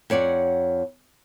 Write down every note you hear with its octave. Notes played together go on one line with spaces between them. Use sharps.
F2 C#5 D5 F#5